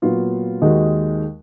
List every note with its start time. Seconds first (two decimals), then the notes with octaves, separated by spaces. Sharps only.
0.02 A#2 F#3 B3 F4
0.62 D#2 D#3 G#3 D#4 F#4